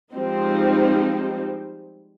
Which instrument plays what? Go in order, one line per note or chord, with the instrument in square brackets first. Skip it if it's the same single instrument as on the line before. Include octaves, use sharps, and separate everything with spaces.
[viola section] F3 G3 G#3 C4 D#4